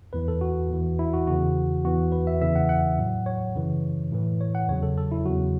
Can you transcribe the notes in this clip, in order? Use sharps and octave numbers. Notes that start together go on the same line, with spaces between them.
E2 E3 B4
A4
F#4
E2 E3
E4
F#4
E2 C#3 E3 F#4
E2 E3 F#4
B4
E5
E2 C#3 E3 E5
F#5
F#5
A2 F#3
C#5
F#2 C#3 E3
A2 E3
C#5
F#5
E2 C#3 F#3 C#5
A4
A4
E4
E2 C#3 F#3 F#4